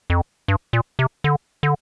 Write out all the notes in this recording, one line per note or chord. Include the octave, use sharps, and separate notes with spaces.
F2
G2
A#2
C3
D3
D3